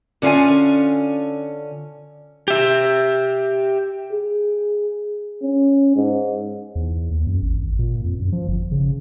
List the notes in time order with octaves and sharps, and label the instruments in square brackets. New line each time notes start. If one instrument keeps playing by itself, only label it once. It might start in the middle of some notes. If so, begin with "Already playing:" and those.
[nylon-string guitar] D3 C#4 F4 F5 G#5
[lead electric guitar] G4 E5
[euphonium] G#4
C#4
G#2
[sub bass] E2
D#2
F#2
G#1
A#2
F2
F#2
F3
G1
C#3